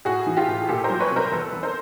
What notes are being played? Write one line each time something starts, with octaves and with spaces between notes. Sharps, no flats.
A2 F#4 G#4
E3
F4 G4
A2
G#4
A#2 G4 A4
A#4 C5
F#3
B4 C#5
C2
A#4 C5
E2 A4 B4
E2
A#4 C5